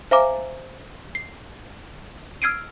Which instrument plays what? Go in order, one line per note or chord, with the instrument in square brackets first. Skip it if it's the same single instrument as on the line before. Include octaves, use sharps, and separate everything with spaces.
[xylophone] C5 E5 F5 G#5 A#5 D6
C7
E6 F6 G#6 C7 D7 D#7